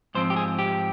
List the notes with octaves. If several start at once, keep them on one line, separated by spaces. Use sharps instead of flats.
G#2 F3 C4 C5
G4
G#4
G4